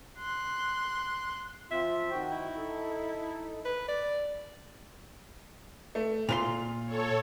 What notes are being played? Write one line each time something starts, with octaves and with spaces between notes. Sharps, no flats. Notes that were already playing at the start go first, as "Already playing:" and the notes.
C6 F#6
F3 C4 F4 E5
D#3 F#4 G5
E4
D#4 A4
B4
D5
A3
A#2 F4 B4 C6 F7
A4 C#5